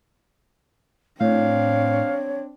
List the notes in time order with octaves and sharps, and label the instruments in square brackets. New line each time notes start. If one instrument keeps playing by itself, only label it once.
[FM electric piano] A2 [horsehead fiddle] C4 D4 [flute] C#5 [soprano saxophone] F5